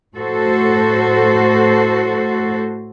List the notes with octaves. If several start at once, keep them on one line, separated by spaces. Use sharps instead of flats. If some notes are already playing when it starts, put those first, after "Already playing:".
A2 F#4 A4 C5